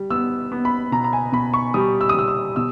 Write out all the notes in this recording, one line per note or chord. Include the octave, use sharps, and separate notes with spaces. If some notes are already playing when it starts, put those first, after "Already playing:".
Already playing: G3
B3 E6
B3
B5
B2 A#5
A#5
G#5
B2 B5
C#6
G3 D#6
E6
D#6
G3 E6
E6
B2 E6